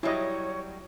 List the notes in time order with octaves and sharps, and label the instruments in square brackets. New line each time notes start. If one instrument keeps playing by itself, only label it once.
[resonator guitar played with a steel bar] F#3 G3 [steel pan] E4 D#5 [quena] C#5